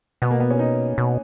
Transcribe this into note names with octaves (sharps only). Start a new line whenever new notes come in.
B2 B3
A#3
B3
C#4
D#4
B2